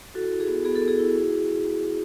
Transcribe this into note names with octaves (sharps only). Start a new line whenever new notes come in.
E4 F#4 A4
E4
G#4
B3
B3 G#4
A4
B3
G#4
E4
F#4